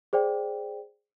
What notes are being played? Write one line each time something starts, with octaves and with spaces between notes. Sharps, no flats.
G#4 C5 D5 G5